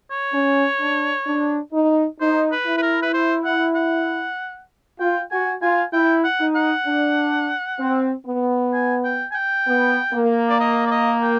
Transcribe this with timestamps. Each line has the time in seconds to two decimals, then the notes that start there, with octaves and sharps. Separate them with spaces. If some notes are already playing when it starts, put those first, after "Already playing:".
0.11 C#5
0.33 C#4
0.80 D4
1.27 D4
1.73 D#4
2.20 D#4 C5
2.52 B4
2.66 E4
2.78 B4
2.82 A#4
3.02 B4
3.13 C5
3.45 F#5
3.75 F#5
4.99 F4 G5
5.31 F#4 G#5
5.62 F4 G#5
5.93 E4 G5
6.24 F#5
6.40 D#4
6.56 F#5
6.86 D4
7.80 C4
8.26 B3
8.74 G#5
9.04 G5
9.32 G#5
9.35 G5
9.67 B3
10.13 A#3
10.49 D5
10.60 D#5
10.86 D5
10.91 D#5
11.23 G5